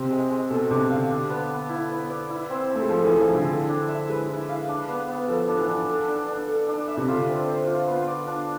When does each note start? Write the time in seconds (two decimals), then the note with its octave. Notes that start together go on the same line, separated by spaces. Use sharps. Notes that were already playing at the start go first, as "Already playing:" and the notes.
Already playing: C3 C4
0.11 G#3
0.30 G#3
0.50 B2 A4
0.70 C3 D4
0.90 D3 F5
1.10 D4
1.30 B3
1.50 B3
1.69 E4
1.90 B3
2.10 D5
2.30 E4
2.49 C4
2.69 C4
2.75 A3
2.82 G#3
2.89 F3 A4
3.05 E3
3.10 E4
3.19 F3
3.29 D3 E4
3.49 A4
3.69 D4
3.89 E5
4.09 G#3 B4
4.29 E4
4.49 F5
4.68 D4
4.88 B3
5.08 B3
5.28 F3 A4
5.48 D4
5.58 E3
5.68 D4
5.88 A4
6.08 D4
6.28 D4
6.48 A4
6.68 D4
6.88 E5
6.97 C3
7.08 D3 F4
7.28 C4
7.48 C5
7.67 F4
7.87 B3
8.07 D5
8.27 D4